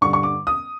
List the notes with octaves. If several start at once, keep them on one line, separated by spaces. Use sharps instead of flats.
G2 D3 C#6
C#6
D6
D#6